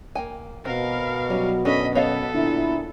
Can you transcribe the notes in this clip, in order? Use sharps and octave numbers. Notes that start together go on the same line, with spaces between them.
A#3 G5 G#5
B2 C4 F#4 A#4 F5
F#3 G3 C#4
F#2 C#4 D4 A4 D#5 B5
B3 A4 C#5 D#5 F5
A#2 D3 E4